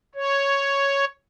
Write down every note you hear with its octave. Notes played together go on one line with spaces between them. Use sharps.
C#5